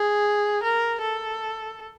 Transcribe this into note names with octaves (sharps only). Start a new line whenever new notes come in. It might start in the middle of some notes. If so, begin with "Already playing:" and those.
Already playing: G#4
A#4
A4